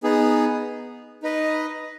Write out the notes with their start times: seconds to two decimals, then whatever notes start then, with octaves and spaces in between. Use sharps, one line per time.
0.03 B3 D#4 G#4
1.23 D#4 B4 D#5